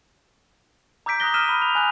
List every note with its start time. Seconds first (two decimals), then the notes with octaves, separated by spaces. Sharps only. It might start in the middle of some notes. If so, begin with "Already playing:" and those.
1.06 A#5 D6 E6 G6 B6 D7
1.20 A#5 D#6 F#6 A#6 G7
1.34 E6 F6 B6 D#7 E7
1.48 B5 G7
1.62 F7
1.75 G#5 F#6 F7